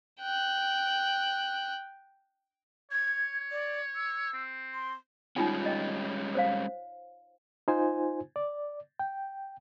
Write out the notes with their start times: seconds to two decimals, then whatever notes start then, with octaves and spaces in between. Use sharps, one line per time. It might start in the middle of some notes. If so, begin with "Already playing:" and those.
0.21 G5 F#6
2.92 C#5 G#6
3.51 D5
3.95 E6
4.34 C4
4.74 C6
5.36 G3 G#3 C#4 D#4 F4 G5
5.66 D#5 G5
6.35 C5 C#5 F5
7.68 D#4 F4 C5 G#5
8.36 D5
8.99 G5